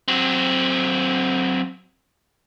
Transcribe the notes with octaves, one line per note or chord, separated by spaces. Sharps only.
F#3 C4